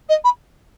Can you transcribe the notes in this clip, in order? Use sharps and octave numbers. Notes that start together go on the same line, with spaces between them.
D#5
B5